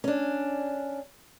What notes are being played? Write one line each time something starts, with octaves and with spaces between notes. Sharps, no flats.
C#4 D4